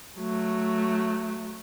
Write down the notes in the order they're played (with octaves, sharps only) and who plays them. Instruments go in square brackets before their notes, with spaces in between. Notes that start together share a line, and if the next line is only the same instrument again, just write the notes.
[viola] F#3 A3